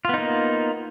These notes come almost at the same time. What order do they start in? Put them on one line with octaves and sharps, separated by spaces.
F4 B3 D#4 A#3